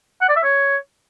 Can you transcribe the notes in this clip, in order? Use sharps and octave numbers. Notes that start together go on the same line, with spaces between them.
F#5
D5
E5
C#5